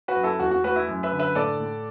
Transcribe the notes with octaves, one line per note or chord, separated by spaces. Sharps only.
F#4 B4
F#2
E4 A4
E2 F#4
F#4
A3 F#4 B4
E4
F#2
B4 E5
D3
B4 E5
A2 A4 D5
A2